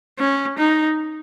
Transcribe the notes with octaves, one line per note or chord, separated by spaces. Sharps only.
C#4
D#4